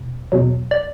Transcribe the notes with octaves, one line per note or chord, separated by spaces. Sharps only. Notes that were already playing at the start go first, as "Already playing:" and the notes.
Already playing: E2 B2
E2 B2 F#3
D5